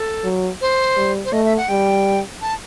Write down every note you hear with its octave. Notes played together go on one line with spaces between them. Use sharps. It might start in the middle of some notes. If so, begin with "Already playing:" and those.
Already playing: A4
F#3
C5
G3
C5
A3 D#5
E5
F#5
G3 G5
A5